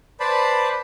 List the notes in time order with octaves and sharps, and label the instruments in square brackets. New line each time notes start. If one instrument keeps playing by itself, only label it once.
[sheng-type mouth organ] B4 C5 D5 A5 B5